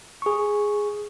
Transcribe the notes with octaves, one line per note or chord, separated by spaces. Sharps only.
G#4 C#6